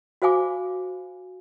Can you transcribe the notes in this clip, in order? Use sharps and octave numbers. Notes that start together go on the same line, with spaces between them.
F#4 C5 F5 G#5 D6